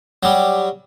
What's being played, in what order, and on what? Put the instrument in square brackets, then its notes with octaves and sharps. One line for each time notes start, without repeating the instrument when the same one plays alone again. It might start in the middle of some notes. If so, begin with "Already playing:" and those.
[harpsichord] F#3 G3